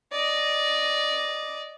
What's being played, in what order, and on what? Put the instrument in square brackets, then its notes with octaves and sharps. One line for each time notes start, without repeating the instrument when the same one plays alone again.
[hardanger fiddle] D5 D#5